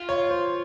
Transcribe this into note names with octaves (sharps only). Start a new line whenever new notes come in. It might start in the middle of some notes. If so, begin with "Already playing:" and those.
Already playing: F4
C#5
C5